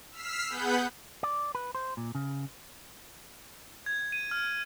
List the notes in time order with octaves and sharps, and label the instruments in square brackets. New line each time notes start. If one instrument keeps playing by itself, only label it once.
[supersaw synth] E6 F6 B6 C7
B3 G#4 B4 F#5 B5 G6
[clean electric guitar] D5
B4
C5
A#2
C#3
[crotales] G#6
D#7
F6